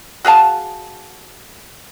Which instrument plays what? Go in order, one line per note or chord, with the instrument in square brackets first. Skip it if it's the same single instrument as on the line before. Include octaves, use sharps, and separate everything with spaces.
[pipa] F#4 G#4 F5 A5